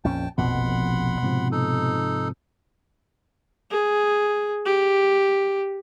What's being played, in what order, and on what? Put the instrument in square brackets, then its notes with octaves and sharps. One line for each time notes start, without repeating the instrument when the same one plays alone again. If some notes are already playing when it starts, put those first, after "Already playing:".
[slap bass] A#1 F2 C#4 [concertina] G5 A5
[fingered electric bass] F1 A#1 F2 [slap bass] B2 [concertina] F#5 B5 C6
[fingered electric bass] G#2 C3 F3
[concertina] D#4 A4
[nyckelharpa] G#4
G4